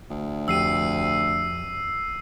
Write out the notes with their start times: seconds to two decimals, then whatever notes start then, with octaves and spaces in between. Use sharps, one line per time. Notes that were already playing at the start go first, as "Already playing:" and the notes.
0.10 D2
0.48 F2 G4 E6 C7 D#7